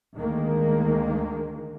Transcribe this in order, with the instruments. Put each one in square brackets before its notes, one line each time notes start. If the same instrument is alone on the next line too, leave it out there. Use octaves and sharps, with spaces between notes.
[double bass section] D2 D#3 G#3 A#3